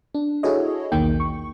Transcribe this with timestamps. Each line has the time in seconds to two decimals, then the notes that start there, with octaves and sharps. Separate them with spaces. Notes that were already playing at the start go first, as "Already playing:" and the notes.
0.15 D4
0.43 E4 F#4 G#4 A4 C#5 D#5
0.92 B1 E2 D#3 A#3 D#4 G5
1.20 C#6